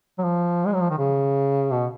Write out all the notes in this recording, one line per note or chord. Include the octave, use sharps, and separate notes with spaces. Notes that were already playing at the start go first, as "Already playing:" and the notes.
F#3
F3
G#3
F#3
F3
D#3
C#3
B2